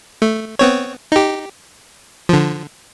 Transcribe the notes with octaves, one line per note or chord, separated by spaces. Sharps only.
A3
B3 C4 C#5
D#4 G4
D3 F3